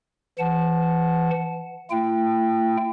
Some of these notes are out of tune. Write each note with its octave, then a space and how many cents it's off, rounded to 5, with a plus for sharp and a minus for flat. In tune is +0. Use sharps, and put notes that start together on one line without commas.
E3 +20 F#5 +0 A5 -20
A3 +40 E4 +45 G5 +0